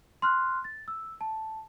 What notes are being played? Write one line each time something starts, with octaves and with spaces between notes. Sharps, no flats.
C6 F6 F#6
A6
E6
A5